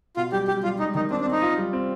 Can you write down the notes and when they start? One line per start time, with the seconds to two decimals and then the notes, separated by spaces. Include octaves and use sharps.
0.17 B2 F4
0.32 G3 G4
0.48 G3 G4
0.63 G3 F4
0.79 G#3 D#4
0.95 D#3 D#4
1.11 C4 D4
1.21 D4
1.26 C4
1.31 D#4
1.42 F4
1.58 G3
1.73 C4